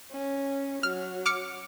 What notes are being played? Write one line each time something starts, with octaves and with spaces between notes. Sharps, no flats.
C#4
F#3 F6
D6 F6 C#7